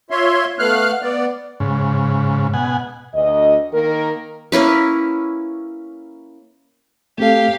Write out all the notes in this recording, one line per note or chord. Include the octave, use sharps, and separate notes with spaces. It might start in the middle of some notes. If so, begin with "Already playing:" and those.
F4 C#5 E5 C6
A3 B3 F5 F6 F#6
B3 D5
G#2 C#3
B2 F#5 G#5
D2 D#5
D#3 A#3 A#4
A#3 C#4 E4 B4
A3 C4 G4 A4 F5